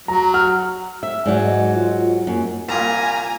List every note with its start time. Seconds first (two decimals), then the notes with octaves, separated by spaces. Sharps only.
0.08 F#3 A#5
0.34 F#5 F6
1.03 E5
1.26 G#2 F#3 D5
1.45 D#5
1.75 F4
2.27 F#2 A#3
2.69 C2 A#2 G#5 A#5